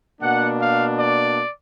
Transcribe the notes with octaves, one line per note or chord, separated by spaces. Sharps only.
B2 A#3 D4 F#5
F5
D5